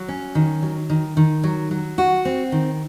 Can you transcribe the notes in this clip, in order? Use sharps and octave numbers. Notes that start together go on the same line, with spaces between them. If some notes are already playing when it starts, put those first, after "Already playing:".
Already playing: F#3
C#4
D#3
F#3
D#3
D#3
F#3
F#3
F#4
C4
D#3